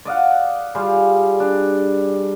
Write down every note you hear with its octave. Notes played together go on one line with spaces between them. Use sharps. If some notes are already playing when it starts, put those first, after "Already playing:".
D5 D#5 F5 F#5
G3 F4 G#4 F5
D4